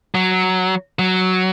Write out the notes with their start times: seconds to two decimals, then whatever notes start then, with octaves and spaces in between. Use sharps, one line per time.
0.15 F#3
0.99 F#3